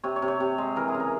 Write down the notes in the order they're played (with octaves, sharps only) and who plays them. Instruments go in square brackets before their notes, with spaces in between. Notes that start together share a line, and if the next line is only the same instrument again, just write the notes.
[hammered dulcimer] C3 C#5
C#5
C3
C#5
C3
G#3
E3 A#4
G#4
C#3
A#4